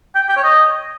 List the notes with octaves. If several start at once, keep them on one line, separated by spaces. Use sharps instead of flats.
G5
G5
C#5
D#5